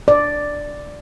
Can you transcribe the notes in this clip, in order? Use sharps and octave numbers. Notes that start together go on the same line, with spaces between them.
D5